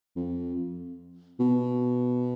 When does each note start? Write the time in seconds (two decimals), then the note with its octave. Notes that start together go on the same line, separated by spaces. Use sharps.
0.16 F2
1.40 B2